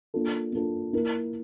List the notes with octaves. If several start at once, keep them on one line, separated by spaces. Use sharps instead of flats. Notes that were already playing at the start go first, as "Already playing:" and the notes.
A#3 D4 F4 A4
A#3 D4 F4 A4
A#3 E4 A#4